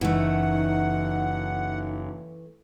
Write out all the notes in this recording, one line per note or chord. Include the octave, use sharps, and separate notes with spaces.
F#1 E3 A3 D#4 F#5